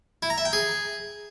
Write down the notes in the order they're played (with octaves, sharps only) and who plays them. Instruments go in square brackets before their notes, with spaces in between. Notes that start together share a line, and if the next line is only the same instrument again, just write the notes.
[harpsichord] E4
A#5
E5
G5
G#4